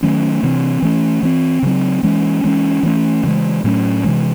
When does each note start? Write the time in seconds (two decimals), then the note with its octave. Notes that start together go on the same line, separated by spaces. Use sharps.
0.02 D#3 F#3 A3 C#4
0.43 C3 E3 C4
0.82 E3 A3 C#4
1.23 E3 C4
1.63 C#3 F#3 C4
2.03 E3 G#3 C#4
2.44 E3 G#3 C#4
2.83 E3 A3 C#4
3.23 C#3 E3 G#3
3.64 A2 F#3 A3 C#4
4.04 C3 E3 G#3